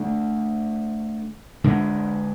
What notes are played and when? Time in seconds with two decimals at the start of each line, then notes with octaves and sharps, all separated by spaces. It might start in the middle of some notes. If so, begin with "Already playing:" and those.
Already playing: D3 A3 D4
1.64 D3 G#3 D4